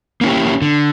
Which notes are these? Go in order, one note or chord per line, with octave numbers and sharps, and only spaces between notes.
A#3 C#4 E4 G4
D3